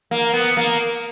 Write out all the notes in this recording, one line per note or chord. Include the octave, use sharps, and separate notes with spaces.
A#3
B3
A#3